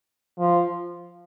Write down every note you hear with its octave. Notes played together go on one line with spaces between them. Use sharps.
F3